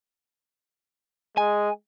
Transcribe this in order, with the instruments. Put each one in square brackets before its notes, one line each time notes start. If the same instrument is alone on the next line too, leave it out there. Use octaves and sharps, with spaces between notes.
[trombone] G#3 [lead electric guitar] G#5